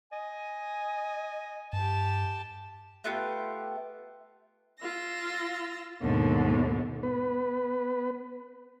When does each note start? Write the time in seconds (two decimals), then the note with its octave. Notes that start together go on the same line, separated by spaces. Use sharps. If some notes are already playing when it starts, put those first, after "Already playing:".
0.12 D#5 G#5
1.73 G2 G4 A5
3.04 A3 B3 F4 G4
4.79 F4 E6 A#6
6.01 D#2 G#2 B2 D3
7.03 B3 B4